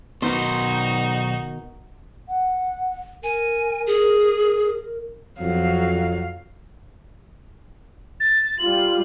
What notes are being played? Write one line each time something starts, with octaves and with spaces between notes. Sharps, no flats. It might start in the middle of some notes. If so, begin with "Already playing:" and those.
B1 B2 D#3 B3 D#4 F#4 C5
F#5
A#4 G#5
G#4
F2 F#3 F5
A6
G3 F4 F#7